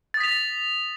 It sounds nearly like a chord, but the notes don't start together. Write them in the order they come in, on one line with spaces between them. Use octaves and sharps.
A6 D#6 B6 F7